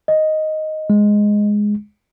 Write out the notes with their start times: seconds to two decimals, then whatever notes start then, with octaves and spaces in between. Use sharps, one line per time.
0.08 D#5
0.90 G#3